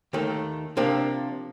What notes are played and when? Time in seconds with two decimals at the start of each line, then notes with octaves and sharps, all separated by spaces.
0.13 D#2 D#3 A3 D#4
0.77 C3 F3 A#3 D4